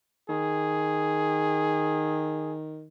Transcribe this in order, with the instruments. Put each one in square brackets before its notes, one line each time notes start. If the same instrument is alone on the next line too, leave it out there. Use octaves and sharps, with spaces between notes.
[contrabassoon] D#3 [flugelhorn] G#4